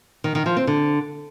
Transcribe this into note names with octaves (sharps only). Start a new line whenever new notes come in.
D#3
D#3
F3
C4
D3